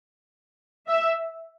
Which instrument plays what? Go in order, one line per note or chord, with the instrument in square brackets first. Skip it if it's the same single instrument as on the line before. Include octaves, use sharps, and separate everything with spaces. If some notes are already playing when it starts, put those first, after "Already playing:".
[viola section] E5